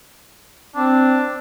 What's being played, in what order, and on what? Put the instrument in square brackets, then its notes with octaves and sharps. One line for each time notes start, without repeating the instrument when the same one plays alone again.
[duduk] C4 [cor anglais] D4